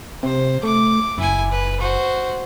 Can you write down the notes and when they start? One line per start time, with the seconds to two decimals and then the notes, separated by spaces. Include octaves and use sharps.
0.23 C3 C5
0.63 A3 D6
1.18 F#1 E4 G#5
1.51 B4
1.80 F#4 C5